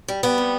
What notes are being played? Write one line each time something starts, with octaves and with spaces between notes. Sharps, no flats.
G3
G3 B3
C3